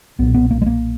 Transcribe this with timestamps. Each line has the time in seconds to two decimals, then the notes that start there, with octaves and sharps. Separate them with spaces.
0.19 B1 A#2 B3
0.34 B3
0.51 A#3
0.62 G#3
0.66 A#3